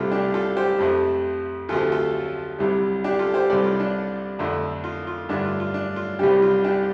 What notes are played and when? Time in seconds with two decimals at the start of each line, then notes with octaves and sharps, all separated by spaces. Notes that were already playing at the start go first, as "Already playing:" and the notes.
Already playing: C2 C3 A3 F4 A4
0.11 D4 G4
0.34 F4 A4
0.57 G4 C5
0.79 F2 C3 F3 A3
1.69 D2 C3 F3 A3 F4 A4
1.92 F4 A4
2.59 C2 C3 G3
3.04 D4 G4
3.19 F4 A4
3.34 G4 C5
3.50 C2 C3 G3 A4 D5
3.64 F4
3.80 D4
4.39 F2 D3 F3 A3
4.84 F4
5.07 F4
5.29 G2 D3 A3 D4
5.45 F4
5.60 F4
5.74 D4
5.96 F4
6.19 C2 C3 G3 D4 G4
6.42 F4
6.64 D4 G4